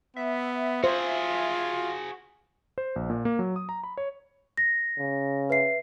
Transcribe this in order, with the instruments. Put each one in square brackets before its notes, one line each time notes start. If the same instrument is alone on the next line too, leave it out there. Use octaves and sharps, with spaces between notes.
[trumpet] B3 [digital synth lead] E5
[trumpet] F4 [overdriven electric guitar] F#4 G#4 [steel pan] C5
[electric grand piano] C5
A#1
A#2
A#3
F#3
D#6
A#5
B5
C#5
[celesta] A#6
[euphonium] C#3
[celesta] B4 E5 C7